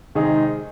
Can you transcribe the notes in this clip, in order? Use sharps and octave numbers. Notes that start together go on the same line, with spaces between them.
C3 D#3 G#3 D#4 G#4